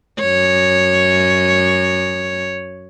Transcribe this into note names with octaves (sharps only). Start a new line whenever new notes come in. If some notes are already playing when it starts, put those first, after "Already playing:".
F#2 C#5